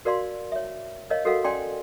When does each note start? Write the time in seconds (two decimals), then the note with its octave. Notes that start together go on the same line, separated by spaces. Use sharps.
0.05 F#4 A#4 D5 F5 C6
0.52 C#5 E5
1.10 A#4 C#5 D#5 F5
1.25 F#4 A4 A#4 D#5 F5 F#5
1.44 C#4 D5 G5 G#5 C6